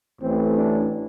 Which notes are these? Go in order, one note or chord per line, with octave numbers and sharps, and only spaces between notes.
A1 A2 E3 C4
D4